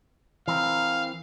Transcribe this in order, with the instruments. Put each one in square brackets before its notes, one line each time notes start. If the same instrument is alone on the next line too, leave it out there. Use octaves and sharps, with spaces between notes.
[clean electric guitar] E3 C4 A#4 [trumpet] F5